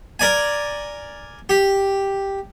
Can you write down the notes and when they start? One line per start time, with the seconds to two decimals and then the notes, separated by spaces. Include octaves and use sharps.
0.19 A#4 D5 G#5
1.49 G4